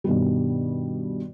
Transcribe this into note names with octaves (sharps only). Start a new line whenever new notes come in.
G2 B2 D#3 G3